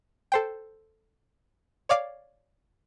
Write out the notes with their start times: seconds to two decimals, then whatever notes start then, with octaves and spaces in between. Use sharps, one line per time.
0.32 A4 C5 G5
1.89 C#5 D5 F5 D6